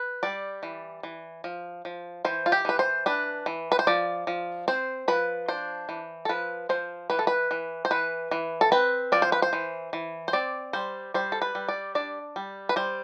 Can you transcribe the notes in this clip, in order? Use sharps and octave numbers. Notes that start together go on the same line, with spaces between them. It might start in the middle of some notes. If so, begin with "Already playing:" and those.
Already playing: B4
G3 D5
E3
E3
F3
F3
E3 C5
F4
G4
E3 B4
C5
D4 B4
E3
B4
C5
F3 D5
F3
C4 C5
F3 B4
D4 C5
E3
A4
F3 B4
F3 C5
E3 B4
A4
B4
E3
C5
E3 B4
E3
A4
C4 B4
F3 D5
C5
B4
C5
E3
E3
C5
C4 D5
G3 C5
G3 C5
A4
B4
G3
D5
D4 D5
G3
B4
G3 C5